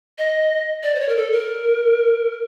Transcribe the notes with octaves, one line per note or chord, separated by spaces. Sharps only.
D#5
D5
C5
C#5
A#4
A4
A#4